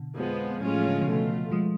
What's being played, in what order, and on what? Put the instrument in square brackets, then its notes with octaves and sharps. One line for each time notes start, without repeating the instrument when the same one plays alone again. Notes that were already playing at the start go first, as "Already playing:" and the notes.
Already playing: [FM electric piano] B2 D3
[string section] F2 F3 G#3 B3
[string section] A2 G#3 C#4 F4 [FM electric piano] F#3
[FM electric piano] F3
D3
C#3 F3
[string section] B2 A3 F4
[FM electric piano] F3 G#3